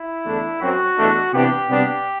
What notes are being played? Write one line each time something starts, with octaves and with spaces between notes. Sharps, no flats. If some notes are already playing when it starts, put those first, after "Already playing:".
Already playing: E4
E2 D3 A3 D4
F#2 F#3 C4 F#4
E2 B2 A3 D4
C3 E3 B3 D4 G4
C3 G3 B3 D4